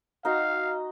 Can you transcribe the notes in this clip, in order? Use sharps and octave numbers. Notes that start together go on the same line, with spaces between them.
D#4 F#4 D#5 F5